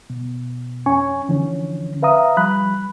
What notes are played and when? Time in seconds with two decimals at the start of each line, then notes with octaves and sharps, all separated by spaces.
0.10 B2
0.86 F2 C#4 G#5 C#6
1.29 D3 E3 F3 C#4
2.02 B4 E5 F5 A#5 D#6
2.37 F3 G3 B5 F#6